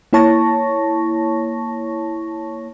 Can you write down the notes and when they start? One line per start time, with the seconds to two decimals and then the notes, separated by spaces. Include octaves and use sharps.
0.13 A#3 E4 C#5 A5 C#6 A#6